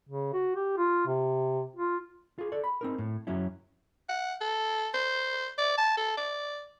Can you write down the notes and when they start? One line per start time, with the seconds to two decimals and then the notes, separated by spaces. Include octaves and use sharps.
0.09 C#3
0.33 F#4
0.56 G4
0.77 F4
1.06 C3
1.76 F4
2.38 F4 G#4
2.52 A4 D5
2.64 B5
2.81 C4 D#4 A#4
2.98 A2
3.27 F#2 F#3 C#4 E4
4.09 F#5
4.41 A4
4.94 C5
5.58 D5
5.78 A5
5.97 A4
6.17 D5